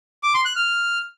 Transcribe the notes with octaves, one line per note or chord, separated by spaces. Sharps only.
D6
C6
F#6
F6